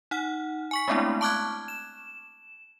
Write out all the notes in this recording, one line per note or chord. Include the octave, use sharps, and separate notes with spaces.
D#4 F#5 F6
G#5 C#6 B6
G#3 A3 B3 C4 D4 E4
A5 C#6 D6 F6 F#6 G#6
E7